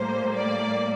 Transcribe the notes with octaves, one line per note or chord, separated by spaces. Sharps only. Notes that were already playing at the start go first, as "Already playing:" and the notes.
Already playing: A2 G3 A#3 C5
D5